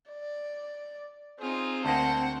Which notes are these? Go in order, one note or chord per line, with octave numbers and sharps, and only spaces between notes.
D5
C4 D#4 F4 G#4
D2 A#3 F#5 G5 A5